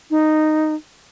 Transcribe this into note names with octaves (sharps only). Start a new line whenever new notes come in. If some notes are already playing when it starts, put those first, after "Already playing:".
D#4